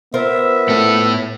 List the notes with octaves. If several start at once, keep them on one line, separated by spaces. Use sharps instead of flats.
B3 F4 A#4 C5 E5
A2 A4